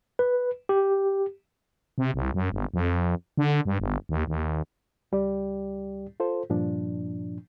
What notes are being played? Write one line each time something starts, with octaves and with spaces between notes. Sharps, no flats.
B4
G4
C3
C2
F#2
G1
F2
D3
G2
G1
D#2
D#2
C#2 G3 G4 D5
F4 A4 C5
G2 A#2 F3 D4